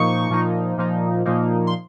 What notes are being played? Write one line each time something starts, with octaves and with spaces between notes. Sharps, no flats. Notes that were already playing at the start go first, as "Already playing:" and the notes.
Already playing: A#2 F3 A#3 D#4 C#6
A#2 F3 A#3 D#4
A#2 F3 A#3 D#4
A#2 F3 A#3 D#4
C6